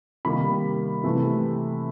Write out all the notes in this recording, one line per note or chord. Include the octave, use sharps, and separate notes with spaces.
C3 D#3 G3 A#3 B5
C3 E3 A3